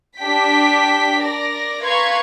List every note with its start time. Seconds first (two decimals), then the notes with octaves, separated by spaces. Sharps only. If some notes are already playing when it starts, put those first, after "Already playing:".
0.19 D4 G4 G5 B6
1.21 A#4 D5 A#6
1.84 B4 F5 A#5 C6 C#6 G#6